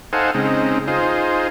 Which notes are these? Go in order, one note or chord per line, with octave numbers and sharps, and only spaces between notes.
D#4 A4 C5 F5 F#5 G#5
C#3 G#3 C4 D#4
D#4 F4 G#4 C5